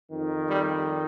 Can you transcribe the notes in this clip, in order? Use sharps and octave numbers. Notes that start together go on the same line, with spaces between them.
F2 D#3
G3